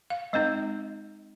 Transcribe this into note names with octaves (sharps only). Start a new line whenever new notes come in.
F5
G#3 C4 D#4 D#5